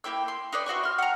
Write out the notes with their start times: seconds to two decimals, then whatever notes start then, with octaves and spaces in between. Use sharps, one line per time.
0.04 A#3 E4 G5 E6
0.28 C6
0.52 D#4 B4 D5
0.66 E4 F#4 C5 C#6
0.83 C6 F6
0.98 F#5 A#5